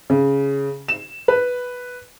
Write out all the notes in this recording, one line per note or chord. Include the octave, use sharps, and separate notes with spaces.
C#3
E7
B4